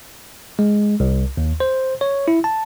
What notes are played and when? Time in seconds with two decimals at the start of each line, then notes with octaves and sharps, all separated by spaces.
0.59 G#3
1.00 C2
1.37 D#2
1.60 C5
2.01 C#5
2.28 E4
2.44 A5